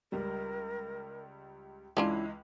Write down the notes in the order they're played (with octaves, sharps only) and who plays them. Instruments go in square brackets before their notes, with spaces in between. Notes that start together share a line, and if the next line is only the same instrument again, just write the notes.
[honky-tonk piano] C#2 G3 [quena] A#4
[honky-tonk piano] C#2 E3 G#3 [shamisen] C#4 D4 F4 [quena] E4